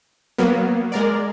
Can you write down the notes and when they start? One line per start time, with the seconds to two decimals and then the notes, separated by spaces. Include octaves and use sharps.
0.38 F#3 A#3 B3
0.92 G#3 A#4 D5